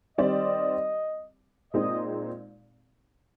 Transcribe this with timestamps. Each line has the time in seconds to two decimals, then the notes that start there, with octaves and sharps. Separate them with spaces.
0.18 D#3 G3 C4 G4 D5 D#5
1.73 A#2 G#3 C4 D#4 D#5